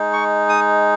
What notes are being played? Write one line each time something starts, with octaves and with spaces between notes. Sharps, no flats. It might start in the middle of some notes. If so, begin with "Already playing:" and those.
Already playing: G#3 D#4
C#6
D#6